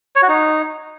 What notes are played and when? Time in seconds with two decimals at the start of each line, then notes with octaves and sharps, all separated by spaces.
0.16 C#5
0.22 F#4
0.29 D#4